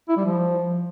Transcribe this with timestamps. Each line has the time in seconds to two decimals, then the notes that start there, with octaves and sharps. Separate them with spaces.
0.09 E4
0.17 G3
0.26 F3